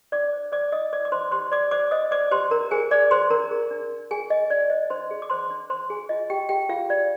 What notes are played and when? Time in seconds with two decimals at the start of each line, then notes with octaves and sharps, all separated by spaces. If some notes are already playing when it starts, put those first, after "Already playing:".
0.12 D#4 D5 D6
0.33 C5
0.52 C5 D5 D6
0.72 D#4 D#5 D#6
0.93 C5 D5 D6
1.05 D6
1.12 D#4 C5 C6
1.31 G4 C5 C6
1.51 C5 D5 D6
1.71 C5 D5 D6
1.91 C5 D#5 D#6
2.11 C5 D5 D6
2.31 G4 C5 C6
2.51 D4 A#4 A#5
2.71 G#4 C5 G#5
2.91 C5 D5 D6
3.11 G#4 C5 C6
3.30 D4 A#4 A#5
3.51 G#4
3.71 D4
3.91 D4
4.10 D4 G#4 G#5
4.30 G#4 D#5
4.50 D4 D5
4.70 C5 D#5
4.90 D4 C5 C6
5.11 G#4
5.22 D6
5.30 C5 C6
5.50 D4
5.70 C5 C6
5.90 G#4 G#5
6.09 F4 D#5
6.30 G4 G#4 G5
6.49 G4 G#4 G5
6.69 F4 G#4 F5
6.89 F4 D5